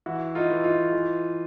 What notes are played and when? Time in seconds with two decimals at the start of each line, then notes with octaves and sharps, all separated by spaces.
0.06 E3 E4 F#4
0.35 D#4 F4
0.50 E3
0.64 D#4 F4
0.93 E3